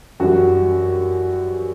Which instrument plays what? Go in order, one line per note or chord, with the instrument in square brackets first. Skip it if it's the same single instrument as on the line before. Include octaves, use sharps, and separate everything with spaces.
[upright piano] F#2 E3 G3 F#4